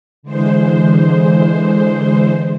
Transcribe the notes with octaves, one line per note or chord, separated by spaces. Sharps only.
D3 E3 G#3 C5